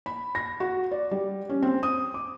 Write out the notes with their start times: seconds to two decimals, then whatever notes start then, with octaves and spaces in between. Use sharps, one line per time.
0.06 B5
0.35 A#6
0.60 F#4
0.91 D5
1.11 G3
1.49 C#4
1.62 C4
1.83 D#6
2.14 D6